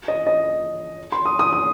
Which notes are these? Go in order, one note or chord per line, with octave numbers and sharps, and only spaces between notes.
D#5
D#5
C6
D#6
D#6
D#6